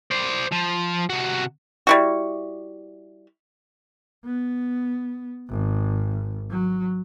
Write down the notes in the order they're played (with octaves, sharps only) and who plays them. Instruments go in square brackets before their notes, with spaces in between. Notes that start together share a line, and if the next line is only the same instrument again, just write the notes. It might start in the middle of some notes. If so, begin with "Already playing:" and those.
[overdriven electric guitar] C5 D5
F3
C3 F#4
[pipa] G3 E4 F#4
[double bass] B3
G#1
F#3